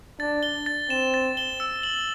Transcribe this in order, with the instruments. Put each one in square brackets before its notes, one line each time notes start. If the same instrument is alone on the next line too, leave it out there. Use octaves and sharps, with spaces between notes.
[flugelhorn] D4 [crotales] A6
[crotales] G7
A6
[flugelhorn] C4 [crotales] E7
[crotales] A6
G7
E6
F#7